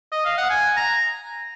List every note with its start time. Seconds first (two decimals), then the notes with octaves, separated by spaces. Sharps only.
0.12 D#5
0.25 F5
0.37 F#5
0.50 G#5
0.76 A#5